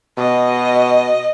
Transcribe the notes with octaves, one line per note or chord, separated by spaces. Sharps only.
B2 D#5